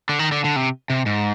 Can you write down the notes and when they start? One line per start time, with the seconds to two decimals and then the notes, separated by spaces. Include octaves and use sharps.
0.09 D3
0.19 D#3
0.32 D3
0.44 D3
0.56 C3
0.90 C3
1.06 G#2